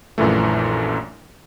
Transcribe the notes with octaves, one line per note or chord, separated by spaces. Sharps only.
A#1 F#2 A#2 E3 A3